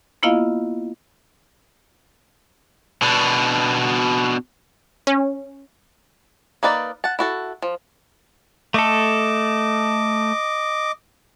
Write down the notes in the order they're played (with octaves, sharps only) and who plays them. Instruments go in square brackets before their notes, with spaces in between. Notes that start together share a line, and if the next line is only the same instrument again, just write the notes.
[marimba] A#3 B3 E4 F4 D#5 F5
[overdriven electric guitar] B2 D4
[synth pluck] C#4
[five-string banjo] A#3 D#4 B4 D5
F#5 A5
E4 F#4 A4
F3
[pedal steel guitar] A3 A4 [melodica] D#5 D6